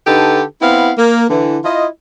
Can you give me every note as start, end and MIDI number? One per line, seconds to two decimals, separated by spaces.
0.06 0.42 50
0.06 0.42 63
0.06 0.42 67
0.06 0.42 69
0.06 0.42 71
0.62 0.92 59
0.62 0.92 60
0.62 0.92 64
0.62 0.92 77
0.62 0.92 78
0.98 1.25 58
1.30 1.59 50
1.30 1.59 52
1.65 1.86 64
1.65 1.86 65
1.65 1.86 75